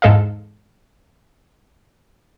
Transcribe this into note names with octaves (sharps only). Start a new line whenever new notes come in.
E2 G#2 G#3 A4 D#5 F5